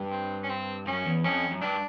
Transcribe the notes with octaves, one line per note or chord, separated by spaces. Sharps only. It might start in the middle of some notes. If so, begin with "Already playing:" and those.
Already playing: G2
C4
C#4
C4
F#2 C#4
E2
F2 C#4
F#2
G2 D4